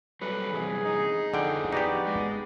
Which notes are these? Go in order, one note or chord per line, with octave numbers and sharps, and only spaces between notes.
F#3 G3 A4 B4
E2 G2 C3 G#4
D#4
F2 D3 G#4 G5
B3 D#4 F#4 G4 D5
G#3